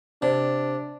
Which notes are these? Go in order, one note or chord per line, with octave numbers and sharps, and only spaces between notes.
C3 D4